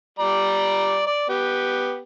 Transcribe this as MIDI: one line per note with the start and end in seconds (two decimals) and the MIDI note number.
0.19 1.06 55
0.19 1.06 74
0.19 1.06 82
1.07 1.26 74
1.29 2.01 59
1.29 2.01 67